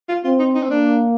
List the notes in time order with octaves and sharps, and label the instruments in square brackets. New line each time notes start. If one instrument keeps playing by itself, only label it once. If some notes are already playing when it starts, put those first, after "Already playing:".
[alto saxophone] F4
[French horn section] C4 [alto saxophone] F4
[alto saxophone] D#4
D#4
C4
[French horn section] A#3 [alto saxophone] D4